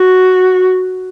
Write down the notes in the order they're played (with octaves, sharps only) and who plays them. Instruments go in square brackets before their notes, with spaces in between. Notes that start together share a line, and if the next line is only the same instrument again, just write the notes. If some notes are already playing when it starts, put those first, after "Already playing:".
Already playing: [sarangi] F#4